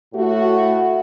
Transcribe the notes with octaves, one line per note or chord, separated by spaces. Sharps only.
A2 A3 F#4